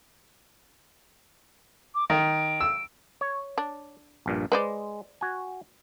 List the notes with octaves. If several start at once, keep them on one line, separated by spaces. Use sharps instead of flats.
D6
D#3 D7
E6
C#5
D4
A#1 G2 A#2
G#3 B4 C5 D5
F#4 G#5